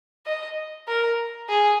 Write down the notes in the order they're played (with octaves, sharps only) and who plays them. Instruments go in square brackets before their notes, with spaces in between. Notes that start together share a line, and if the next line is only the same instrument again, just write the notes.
[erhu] D#5
A#4
G#4